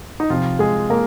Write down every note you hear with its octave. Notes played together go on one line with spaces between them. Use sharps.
D#4
C3 F3 F4
G#3 G#4
A#3 A#4